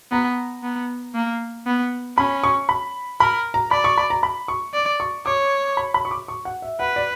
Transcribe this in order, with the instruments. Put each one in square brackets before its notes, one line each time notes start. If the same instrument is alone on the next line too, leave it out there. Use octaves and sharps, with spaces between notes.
[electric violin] B3 [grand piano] A#5
[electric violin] B3
A#3
B3
[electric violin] C#4 [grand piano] B5
[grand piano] C#6
B5
[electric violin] A#4 [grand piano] B5
[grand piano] A#5
[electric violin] D5 [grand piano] B5
[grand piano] C#6
B5
A#5
B5
C#6
[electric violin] D5
[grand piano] C#6
[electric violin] C#5 [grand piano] D6
[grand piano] B5
B5
C#6
D6
C#6
F#5
E5
[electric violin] B4 [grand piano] F#5
[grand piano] D5